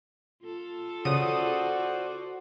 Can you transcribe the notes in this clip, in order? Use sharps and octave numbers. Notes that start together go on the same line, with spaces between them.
F4 A4
C#3 F#4 C5 D5 D#6 D#7